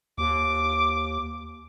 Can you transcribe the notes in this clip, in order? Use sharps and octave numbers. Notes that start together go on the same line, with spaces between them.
D#2 D6